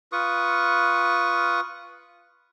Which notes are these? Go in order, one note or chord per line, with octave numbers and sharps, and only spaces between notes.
F4 B4 C#6 D#6